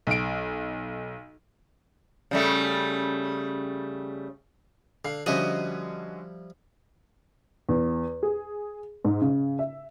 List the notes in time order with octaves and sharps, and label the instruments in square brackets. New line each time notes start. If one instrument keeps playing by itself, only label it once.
[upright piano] B1 D7
[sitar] C#3 G3 A3
[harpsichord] D3 [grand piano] F5
[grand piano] D3 C#4 F#4 [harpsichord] F3 G3 E4 [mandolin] D#5
[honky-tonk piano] E2
G#4
G#2
C#3
E5